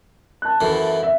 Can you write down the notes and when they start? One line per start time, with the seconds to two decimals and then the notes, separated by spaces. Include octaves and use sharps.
0.42 A5 F#6
0.61 F#2 A2 E3
1.03 E5